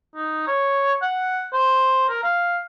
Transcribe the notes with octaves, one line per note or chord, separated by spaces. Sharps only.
D#4
C#5
F#5
C5
A#4
F5